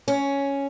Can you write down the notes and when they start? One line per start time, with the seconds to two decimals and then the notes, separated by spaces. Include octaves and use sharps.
0.08 C#4